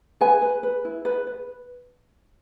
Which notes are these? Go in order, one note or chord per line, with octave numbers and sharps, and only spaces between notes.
B4 G#5
B4
B4
E4
B4
B4